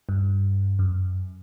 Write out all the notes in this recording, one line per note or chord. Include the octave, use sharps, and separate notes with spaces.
G2
F#2